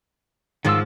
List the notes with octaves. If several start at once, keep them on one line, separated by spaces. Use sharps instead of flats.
G#2 D#3 F3 F4 E6